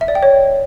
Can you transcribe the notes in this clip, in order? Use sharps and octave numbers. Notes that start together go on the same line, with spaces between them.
E5
D5
G5
C#5